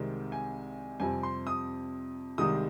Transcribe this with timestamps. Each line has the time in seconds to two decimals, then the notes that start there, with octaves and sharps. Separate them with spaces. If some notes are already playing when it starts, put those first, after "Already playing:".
Already playing: C2 C3 D#3 G#3 C4 A#4
0.32 G#5
1.00 F2 C3 G3 C4 G#5
1.23 C6
1.47 D#6
2.38 C2 C3 D#3 G#3 D#6